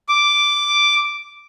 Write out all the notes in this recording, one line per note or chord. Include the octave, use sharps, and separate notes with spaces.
D6